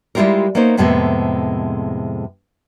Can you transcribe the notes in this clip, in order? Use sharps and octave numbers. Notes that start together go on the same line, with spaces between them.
G3 G#3 E4 F4 G4 A#4
A#3 B3 C#4 D#4 C5
F2 A2 C3 G#3 A#3 B3